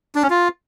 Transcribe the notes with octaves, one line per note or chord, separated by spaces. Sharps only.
D4
C#4
F4